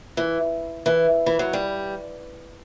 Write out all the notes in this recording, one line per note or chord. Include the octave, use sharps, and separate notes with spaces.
E3
E3
E3
F#3
G3